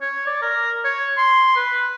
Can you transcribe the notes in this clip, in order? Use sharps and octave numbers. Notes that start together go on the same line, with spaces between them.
C#5
D5
A#4
C#5
C6
B4